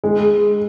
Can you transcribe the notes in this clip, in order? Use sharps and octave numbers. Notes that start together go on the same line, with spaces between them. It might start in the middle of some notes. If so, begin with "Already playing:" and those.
G#3